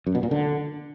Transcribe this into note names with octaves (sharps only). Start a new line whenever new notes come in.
F#2
B2
A#2
D3